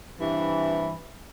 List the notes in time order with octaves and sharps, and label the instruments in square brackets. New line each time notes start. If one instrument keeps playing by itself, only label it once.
[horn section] G2 C3 E3